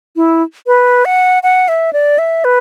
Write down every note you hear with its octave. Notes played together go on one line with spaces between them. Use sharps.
E4
B4
F#5
F#5
E5
D5
E5
B4